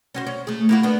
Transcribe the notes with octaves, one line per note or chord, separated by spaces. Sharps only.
C#4 F#4 C5
C#4
A3 G#4
A#3 E4 F#4
B3 D4